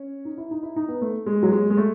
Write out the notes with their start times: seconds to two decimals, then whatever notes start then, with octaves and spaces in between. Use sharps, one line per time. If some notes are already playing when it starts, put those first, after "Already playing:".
Already playing: C#4
0.25 D#4
0.38 E4
0.51 D#4
0.63 E4
0.76 D#4
0.88 B3
1.01 A3
1.26 G#3
1.43 F#3
1.52 G#3
1.70 G#3
1.77 A3